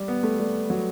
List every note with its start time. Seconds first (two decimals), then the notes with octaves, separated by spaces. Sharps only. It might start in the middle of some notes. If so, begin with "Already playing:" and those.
Already playing: G3
0.08 B3
0.23 A3
0.39 G3
0.70 F#3